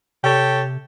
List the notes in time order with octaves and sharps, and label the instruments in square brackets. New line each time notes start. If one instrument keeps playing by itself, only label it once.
[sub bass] C3 [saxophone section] G4 A4 C#5